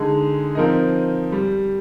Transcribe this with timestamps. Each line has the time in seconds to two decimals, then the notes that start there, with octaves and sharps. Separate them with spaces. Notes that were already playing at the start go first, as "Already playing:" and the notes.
Already playing: D3 G#3 D#4 G#4
0.55 F3 C4 D#4 A#4 D#5
1.32 G3